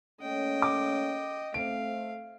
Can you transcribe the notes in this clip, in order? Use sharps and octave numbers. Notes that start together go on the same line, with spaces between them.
A3 A#3 C#4 D#5 G5
D6
A3 C4 F5 D7